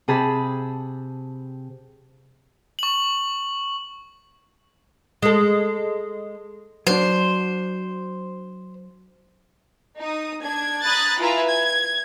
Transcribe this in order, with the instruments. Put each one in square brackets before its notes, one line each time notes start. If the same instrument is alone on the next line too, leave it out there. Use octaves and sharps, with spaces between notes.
[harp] C3 G#4 A5 B5
[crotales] C#6 F#7
[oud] G#3 A4
[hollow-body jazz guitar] F#3 D4 [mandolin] C5
[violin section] D#4 D#6
D4 G#6
A#5 B5 D#6 F#6 G#6 A6
E4 F4 B4 E5 G#5 A#5
G#6